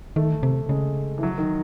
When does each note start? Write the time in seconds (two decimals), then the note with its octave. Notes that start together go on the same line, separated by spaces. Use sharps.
0.16 D#3 A3
0.43 C3
0.69 C#3 G#3
1.18 E3
1.23 F#3
1.38 D#3